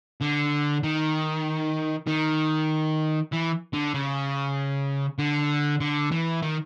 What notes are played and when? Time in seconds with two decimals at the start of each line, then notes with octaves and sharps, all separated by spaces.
0.21 D3
0.83 D#3
2.07 D#3
3.32 E3
3.73 D3
3.94 C#3
5.18 D3
5.81 D3
6.12 E3
6.42 D#3